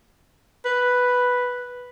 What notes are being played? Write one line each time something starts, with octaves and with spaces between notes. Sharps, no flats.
B4